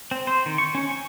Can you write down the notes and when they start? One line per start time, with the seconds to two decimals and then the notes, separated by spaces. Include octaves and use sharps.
0.11 C4
0.27 C5
0.46 D#3
0.58 C#6
0.75 C#4
0.88 C#6